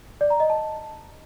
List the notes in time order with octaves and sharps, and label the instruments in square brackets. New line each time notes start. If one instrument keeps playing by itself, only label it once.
[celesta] D5
A#5
D#5
A5